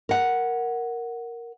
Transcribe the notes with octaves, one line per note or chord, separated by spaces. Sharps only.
A#4 F#5